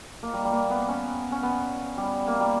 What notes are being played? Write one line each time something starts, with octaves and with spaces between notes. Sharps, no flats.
A#3
G3
G3
A#3
B3
C#4
C#4
B3
G3
A#3
G3